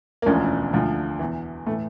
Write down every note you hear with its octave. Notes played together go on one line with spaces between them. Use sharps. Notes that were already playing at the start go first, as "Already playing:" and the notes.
A#3
E1 D2 D3 F3 C#4
D2 D3 F3
E2 E3
A2 E3 A3